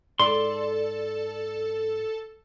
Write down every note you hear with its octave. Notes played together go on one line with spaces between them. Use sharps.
G#2 A4 D5 C6